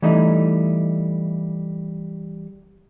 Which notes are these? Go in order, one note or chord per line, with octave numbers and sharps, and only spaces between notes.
E3 G3 A3 D#4